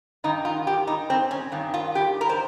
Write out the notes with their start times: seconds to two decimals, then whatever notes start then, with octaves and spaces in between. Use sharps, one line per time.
0.24 G2 D#3 D#4
0.45 F4
0.67 G4
0.87 D#4
1.10 C4
1.31 C#4
1.52 G2 D#3
1.74 F4
1.95 G4
2.21 A#4
2.29 C5